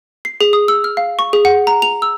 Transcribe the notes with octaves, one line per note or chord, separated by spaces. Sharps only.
C7
G#4
D#6
E6
F6
F5
C#6
G#4
F#5
A#5
F7
E6